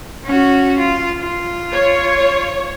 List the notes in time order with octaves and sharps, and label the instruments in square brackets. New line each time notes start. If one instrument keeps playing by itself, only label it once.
[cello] C#4 F#4
F4
F4
[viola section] C#5